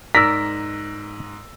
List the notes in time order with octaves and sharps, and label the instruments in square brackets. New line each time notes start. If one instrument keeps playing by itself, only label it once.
[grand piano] G#2 [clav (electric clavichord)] A#4 D5 [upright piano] E6 A#6 [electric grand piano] B6